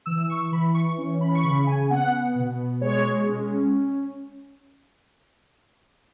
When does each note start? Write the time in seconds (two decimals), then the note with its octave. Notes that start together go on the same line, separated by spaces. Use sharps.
0.06 E3 E6
0.30 C#6
0.52 E3 B5
0.74 C#6
0.98 C#4
1.21 B5
1.35 C#6
1.44 C#3 B5
1.67 G#5
1.90 B3 F#5
2.35 B2
2.81 G#3 C#5
3.28 C#4